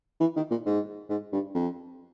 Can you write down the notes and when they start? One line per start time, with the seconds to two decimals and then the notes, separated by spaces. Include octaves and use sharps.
0.20 E3
0.36 D#3
0.50 A#2
0.66 G#2
1.09 G#2
1.32 G2
1.54 F2